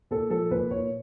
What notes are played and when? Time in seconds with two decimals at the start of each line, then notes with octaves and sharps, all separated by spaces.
0.11 A#2 A4
0.30 F3 A4
0.51 A#2 B4
0.70 A#2 C#5